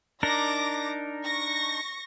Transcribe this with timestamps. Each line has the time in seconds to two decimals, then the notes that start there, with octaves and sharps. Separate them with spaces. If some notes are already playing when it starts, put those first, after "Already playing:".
0.23 D4 D#4 A#4 D6 A#6
1.24 C#6 A#6